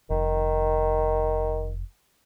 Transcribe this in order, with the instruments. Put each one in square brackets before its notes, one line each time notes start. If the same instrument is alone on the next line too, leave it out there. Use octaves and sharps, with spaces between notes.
[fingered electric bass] F1 [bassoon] D#3